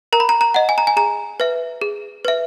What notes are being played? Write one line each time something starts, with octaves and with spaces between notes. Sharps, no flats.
A#4 A#5
B5
A#5
A#5
D#5 F#5
G#5
A#5
G#5
G#4 A#5
B4 E5
G#4
B4 E5